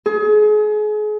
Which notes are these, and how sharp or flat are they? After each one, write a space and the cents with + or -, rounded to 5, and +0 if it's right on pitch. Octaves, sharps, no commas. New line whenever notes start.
G#4 +35